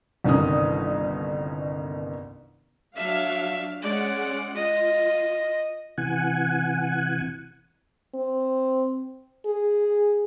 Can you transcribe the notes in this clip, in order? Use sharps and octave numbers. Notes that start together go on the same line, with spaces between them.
G1 C2 D#3 C#4 D#6
F#3 D4 E5 F5
G#3 C#4 D5 F#5
F4 D#5
C3 E3 F#5 G#5
C4
G#4